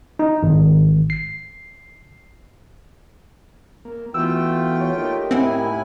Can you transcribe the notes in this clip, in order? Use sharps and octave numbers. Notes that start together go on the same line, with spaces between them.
D#4
G#1
C7
A#3
E3 A3 B3 F4 F#4 G5 E6
C#5
A#3 D#4 G4
A2 C4 E4 E5 F#5 G#5